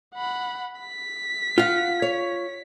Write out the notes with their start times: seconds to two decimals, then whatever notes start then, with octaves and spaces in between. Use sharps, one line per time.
0.15 F#5 B5
0.81 B6
1.58 F4 F5 F#5
2.02 C#5